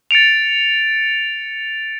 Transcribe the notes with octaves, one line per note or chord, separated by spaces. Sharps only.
A6 C#7 D7 F7